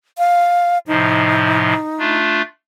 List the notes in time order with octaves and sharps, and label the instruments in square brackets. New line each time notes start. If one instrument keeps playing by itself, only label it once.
[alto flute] F5
[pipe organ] A2 C3 F3 [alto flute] D#4
[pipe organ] A3 D4 F4